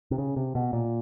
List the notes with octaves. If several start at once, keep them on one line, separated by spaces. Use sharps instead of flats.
C3
C#3
C3
B2
A#2